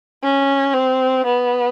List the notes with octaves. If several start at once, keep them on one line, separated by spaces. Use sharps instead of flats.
C#4
C4
B3